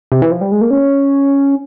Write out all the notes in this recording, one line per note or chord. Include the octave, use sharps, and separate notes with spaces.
C3
E3
F3
G3
G#3
A#3
C#4